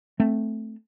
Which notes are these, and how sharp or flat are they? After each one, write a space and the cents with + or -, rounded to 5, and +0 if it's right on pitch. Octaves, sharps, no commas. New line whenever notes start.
A3 +0 C4 +0